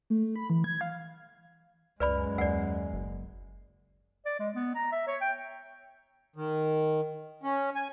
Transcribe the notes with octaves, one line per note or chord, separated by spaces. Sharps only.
A3
B5
E3
G#6
F5
C#2 F#2 G#3 B4 D5 B5
D#2 D5 F#5
F#1
D5
G#3
B3
A#5
E5
C#5
G5
D#3
C#4
G#5